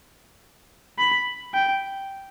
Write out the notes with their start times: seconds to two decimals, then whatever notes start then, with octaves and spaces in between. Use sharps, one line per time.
0.98 B5
1.54 G5